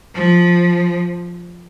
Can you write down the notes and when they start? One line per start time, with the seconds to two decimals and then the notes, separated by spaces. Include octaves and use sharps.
0.15 F3